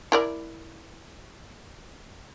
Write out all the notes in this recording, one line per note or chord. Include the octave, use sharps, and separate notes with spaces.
E4 A#4 D5